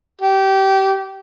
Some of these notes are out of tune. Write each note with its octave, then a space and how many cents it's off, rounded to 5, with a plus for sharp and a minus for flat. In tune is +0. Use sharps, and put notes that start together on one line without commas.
G4 -25